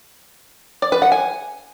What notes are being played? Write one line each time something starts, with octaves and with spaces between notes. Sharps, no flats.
D5
B4
F#5
G#5